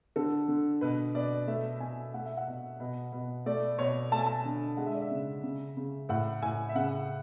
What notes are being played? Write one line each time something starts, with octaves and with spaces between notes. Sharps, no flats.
D3 A4
D3
B2 B4
B2 D5
A3 E5
B2 G#5
A3 F#5
E5
F#5
B2
B2
B2
A3 D5
B2 C#5
A3 A5
G#5
A5
D3 G#5
G#3 F#5
E5
D5
E5
C#3
C#3
C#3
A2 F#5
A2 G#5
E5
C#3 F#5